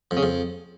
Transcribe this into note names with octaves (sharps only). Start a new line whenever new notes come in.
F2
C#3
F2